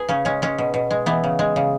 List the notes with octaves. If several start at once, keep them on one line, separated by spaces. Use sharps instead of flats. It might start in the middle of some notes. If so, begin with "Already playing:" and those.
Already playing: G#4 B4
C#3 C#4
G#3 C#4
G#3 C#4
B2
B2
G#3
E3 B3
C#3
G#3
C#3